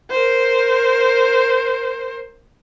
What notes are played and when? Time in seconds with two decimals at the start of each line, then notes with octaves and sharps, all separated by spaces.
0.10 A#4 C5